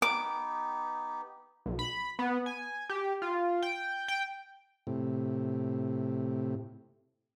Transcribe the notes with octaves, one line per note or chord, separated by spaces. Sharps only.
B3 D#4 G4 D6
B1
B5
B3
G#5
G4
F4
G5
G5
A2 C3